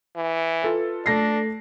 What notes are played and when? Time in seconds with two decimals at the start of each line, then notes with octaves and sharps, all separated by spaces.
0.16 E3
0.63 F4 A4 B4
1.06 A3 D4 A#6 C7